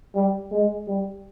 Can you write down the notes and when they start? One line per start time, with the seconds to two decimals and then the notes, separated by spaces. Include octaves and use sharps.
0.15 G3
0.52 G#3
0.88 G3